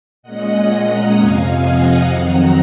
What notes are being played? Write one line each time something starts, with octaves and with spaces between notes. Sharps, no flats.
A#2 G#3 C#4 D#5 F#5
F#5 A#5
F2 C3 F3 F5 G#5
D#5 F#5
F2 D#3 F#3 C4 F#5 A#5